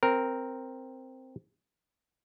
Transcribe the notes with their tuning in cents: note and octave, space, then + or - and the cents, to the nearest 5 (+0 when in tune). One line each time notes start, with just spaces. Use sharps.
C4 +0 A#4 +0